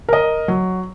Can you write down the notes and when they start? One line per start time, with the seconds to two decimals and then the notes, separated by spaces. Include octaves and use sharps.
0.09 A#4 D#5
0.48 F#3